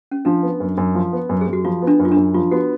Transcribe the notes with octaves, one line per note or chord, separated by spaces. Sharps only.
C#4
F3 D4
B3
F#2
F#2
F3
B3
F#2
G#4
F#2
F#4
F3 F4
B3
D4
F#2
F4
D4
F#2
F3 F4
B3 F#4